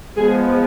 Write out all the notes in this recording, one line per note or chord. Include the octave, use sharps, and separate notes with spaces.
F3 G#3 B3 G#4